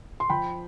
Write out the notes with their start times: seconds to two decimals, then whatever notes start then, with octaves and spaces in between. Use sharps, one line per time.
0.20 C6
0.30 F3 G5 B5